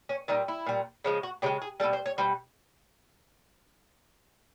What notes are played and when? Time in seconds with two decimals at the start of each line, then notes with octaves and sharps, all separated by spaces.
0.09 C#4
0.28 A#2 G3 D#4
0.48 E4
0.66 A#2 G3
1.04 C#3 F3 G#3
1.23 F#4
1.42 C#3 F3 G#3 G4
1.62 G#4
1.80 G3 A4
1.84 B2
1.93 C5
2.06 C#5
2.18 B2 G3 C5